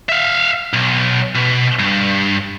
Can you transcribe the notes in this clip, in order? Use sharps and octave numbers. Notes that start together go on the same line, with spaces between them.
E5 F5
B1
B2
G2